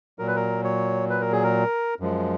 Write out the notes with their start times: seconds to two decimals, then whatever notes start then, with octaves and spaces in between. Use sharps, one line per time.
0.19 A#2 F#3 A#4
0.27 B4
0.36 A#4
0.64 C#5
1.10 B4
1.21 A#4
1.32 G#4
1.44 A#4
2.00 F#2 F3 G#3